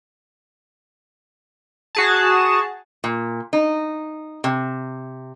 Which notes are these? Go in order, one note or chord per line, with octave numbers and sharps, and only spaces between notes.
F#4 G#4 A5
A#2
D#4
C3